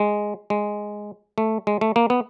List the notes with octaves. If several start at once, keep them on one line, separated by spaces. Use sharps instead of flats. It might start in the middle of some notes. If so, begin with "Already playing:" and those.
Already playing: G#3
G#3
A3
G#3
A3
A#3
B3